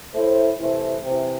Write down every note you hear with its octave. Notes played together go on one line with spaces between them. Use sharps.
A2 A3 E4 C5
C3 E3 A3 E4 C5
C3 E3 C4